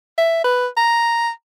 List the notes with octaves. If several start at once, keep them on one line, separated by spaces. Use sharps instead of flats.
E5
B4
A#5